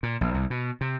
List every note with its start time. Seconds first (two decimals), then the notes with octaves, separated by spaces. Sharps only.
0.03 A#2
0.21 A#1
0.34 C2
0.50 B2
0.81 C3